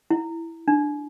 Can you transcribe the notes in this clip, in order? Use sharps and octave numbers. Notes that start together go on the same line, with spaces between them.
E4
D4